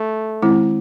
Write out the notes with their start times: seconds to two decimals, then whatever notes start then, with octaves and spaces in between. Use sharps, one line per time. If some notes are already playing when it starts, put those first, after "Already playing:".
Already playing: A3
0.42 D#3 G#3 C4 E4